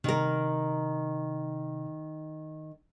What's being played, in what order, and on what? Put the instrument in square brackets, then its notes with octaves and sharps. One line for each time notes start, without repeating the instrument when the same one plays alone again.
[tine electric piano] C3 [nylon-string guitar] D#3 A#4